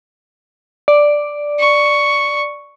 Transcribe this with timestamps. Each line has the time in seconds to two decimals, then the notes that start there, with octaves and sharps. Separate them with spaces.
0.88 D5
1.59 C#6